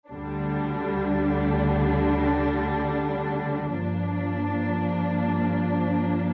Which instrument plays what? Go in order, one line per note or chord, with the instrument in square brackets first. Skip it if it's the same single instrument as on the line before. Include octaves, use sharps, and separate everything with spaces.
[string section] D2 D3 G3 D4
G2 F3 A#3 D4